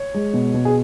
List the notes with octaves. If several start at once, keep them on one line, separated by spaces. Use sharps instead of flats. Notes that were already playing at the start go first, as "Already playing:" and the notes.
Already playing: C#5
G#3
B2
B2
G#4